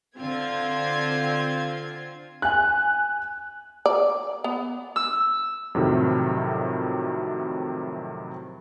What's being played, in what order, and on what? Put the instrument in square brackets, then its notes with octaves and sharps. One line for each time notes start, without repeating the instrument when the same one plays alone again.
[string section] D3 C4 F4 G#6
[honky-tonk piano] G#5 F#6
[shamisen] D5
B3
[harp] E6
[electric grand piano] F2 A2 C3 D#3 F#3